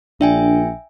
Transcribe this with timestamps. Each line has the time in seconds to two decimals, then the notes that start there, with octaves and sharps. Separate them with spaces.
0.21 A#1 D4 E5 G5 G#5